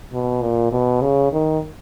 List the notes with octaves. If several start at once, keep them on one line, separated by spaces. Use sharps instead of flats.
B2
A#2
B2
C#3
D#3